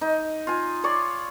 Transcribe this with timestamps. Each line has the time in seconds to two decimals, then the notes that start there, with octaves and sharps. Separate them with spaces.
0.01 D#4
0.47 F4 G#5
0.84 C#5 D5 C6 C#6